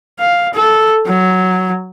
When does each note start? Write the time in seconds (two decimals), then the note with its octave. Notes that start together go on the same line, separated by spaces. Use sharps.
0.20 F5
0.54 A4
1.06 F#3